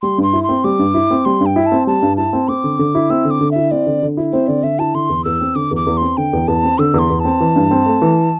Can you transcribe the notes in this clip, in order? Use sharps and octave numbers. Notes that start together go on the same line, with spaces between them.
G3 C6
G2 C6
E4
C6
C4
G3 D6
G2
E4
C4
G3 C6
G2
G5
E4
A5
C4
G3 A5
G2
E4 A5
C4
C4 D6
D3
D3
E4
C4 E6
D3
D6
D3
E4 E5
C4 D5
D3
D3
E4
C4 C5
D3 D5
D3 E5
E4 A5
D3 C6
E2
E2 E6
C4
D3 D6
E2
D6
E2
C4 C6
D3 G5
E2
E2 A5
C4
D3 E6
E2 C6
E2
A5
C4
E3
G2
C4
A3
E3